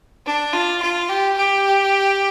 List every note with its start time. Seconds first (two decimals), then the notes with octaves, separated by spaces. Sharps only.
0.25 D4
0.53 F4
0.82 F4
1.09 G4
1.37 G4